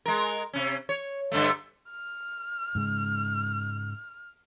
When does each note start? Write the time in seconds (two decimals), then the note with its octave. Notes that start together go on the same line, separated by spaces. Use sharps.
0.06 G#3 A#4
0.53 C3 C#4
0.89 C#5
1.32 G2 D3 A3
1.90 F6
2.75 G#2 C#3 G#3